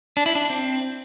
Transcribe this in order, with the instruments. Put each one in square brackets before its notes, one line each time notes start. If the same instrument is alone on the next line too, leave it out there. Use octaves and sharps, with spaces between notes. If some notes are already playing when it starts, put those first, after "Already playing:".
[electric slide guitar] D4
E4
D4
C4